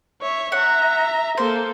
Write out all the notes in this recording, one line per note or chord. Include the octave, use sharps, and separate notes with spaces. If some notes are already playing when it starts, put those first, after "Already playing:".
C#5 E5
E5 F#5 A#5
A#3 A4 C5